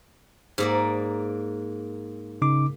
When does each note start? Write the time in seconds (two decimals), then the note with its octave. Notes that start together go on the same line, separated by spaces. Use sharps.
0.58 G#2 A#3 D5
2.42 C#3 D#4 D6